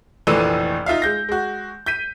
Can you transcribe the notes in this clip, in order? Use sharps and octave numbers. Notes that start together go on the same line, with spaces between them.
F1 A#1 E3 A3 E6 D#7
D#4 F4 E5 F5
G#3 G6 A#6
G#3 F#4
G6 B6 D#7